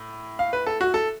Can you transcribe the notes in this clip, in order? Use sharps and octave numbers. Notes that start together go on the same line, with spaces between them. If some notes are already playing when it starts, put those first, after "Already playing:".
Already playing: A2
F5
B4
A4
F#4
A4